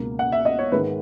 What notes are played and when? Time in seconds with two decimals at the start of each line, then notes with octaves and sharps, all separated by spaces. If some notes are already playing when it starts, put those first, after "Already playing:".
Already playing: C#2 B2 A#3
0.19 F#5
0.32 E5
0.45 D#5
0.59 C#5
0.72 G#2 D#3 G#3 B4